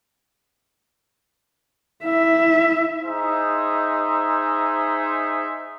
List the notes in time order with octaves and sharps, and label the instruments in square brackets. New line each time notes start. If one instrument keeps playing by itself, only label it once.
[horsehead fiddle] E4 E5
[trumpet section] D#4 G#4 C5 E5